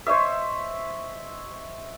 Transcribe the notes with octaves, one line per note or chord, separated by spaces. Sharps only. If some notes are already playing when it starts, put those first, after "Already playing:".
C5 C#5 D#5 E5